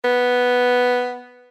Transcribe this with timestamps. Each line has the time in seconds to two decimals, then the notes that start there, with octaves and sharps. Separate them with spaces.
0.04 B3